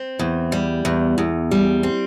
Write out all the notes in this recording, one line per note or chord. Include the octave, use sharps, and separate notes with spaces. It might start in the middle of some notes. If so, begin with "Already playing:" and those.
Already playing: C4
E2
G3
E2
E2
G3
C4